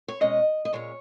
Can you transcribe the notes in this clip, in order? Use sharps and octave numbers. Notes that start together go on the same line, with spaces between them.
C#5
B2 G#3 C#4 D#5
D#5
A#2 G#3 C#4 C#5